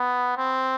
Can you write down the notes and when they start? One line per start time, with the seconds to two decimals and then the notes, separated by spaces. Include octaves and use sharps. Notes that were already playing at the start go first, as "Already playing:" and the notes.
Already playing: B3
0.37 C4